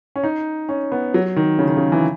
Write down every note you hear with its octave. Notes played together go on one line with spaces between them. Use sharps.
C#4
D#4
C#4
B3
F#3
D#3
C#3
D#3
C#3
E3